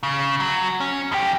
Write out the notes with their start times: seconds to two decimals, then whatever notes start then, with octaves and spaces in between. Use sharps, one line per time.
0.03 C#3
0.40 F#3
0.81 C#4
1.12 F2 G4